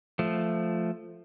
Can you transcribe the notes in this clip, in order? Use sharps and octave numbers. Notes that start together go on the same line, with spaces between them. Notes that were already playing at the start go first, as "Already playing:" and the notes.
F3 A3